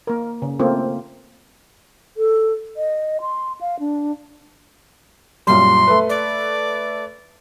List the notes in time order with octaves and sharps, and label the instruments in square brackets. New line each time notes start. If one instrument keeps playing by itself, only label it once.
[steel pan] A#3 A#4
C#3
A3 A#3 C4 F4
[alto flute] A4
D#5
C6
F5
D4
[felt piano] F#2 A#2 G3 [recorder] C6
[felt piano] A3 B4
[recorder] D5